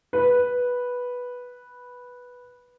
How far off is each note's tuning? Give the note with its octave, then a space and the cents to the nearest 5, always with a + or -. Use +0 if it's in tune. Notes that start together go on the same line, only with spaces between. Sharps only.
B4 -5